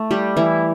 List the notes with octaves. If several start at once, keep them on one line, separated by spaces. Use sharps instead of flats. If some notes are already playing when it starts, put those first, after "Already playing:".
Already playing: A3
G3 G4
E3 E4